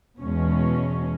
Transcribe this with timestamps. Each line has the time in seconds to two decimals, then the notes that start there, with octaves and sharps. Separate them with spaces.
0.20 E2 B2 G#3 C#4